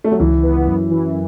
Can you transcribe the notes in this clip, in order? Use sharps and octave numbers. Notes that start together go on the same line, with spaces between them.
A3
F#3
C#2 E3
B3
F#2
E3